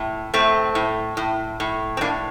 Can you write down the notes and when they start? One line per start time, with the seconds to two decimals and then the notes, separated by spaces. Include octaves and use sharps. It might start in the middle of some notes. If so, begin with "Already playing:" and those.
Already playing: A2
0.34 A2 A3 C4
0.75 A2
1.17 A2
1.60 A2
1.97 C4
2.01 A2 A#3 D4